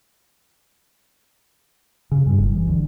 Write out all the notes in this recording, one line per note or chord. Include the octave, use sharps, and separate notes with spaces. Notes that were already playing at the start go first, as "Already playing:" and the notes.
C#3
G2
F#1
E3
D2